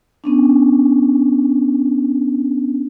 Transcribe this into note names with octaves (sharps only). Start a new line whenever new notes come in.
B3 C#4 D4